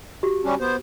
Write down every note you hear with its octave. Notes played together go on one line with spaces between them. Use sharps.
F#4 G4
G3 C#4 D4
B3 C5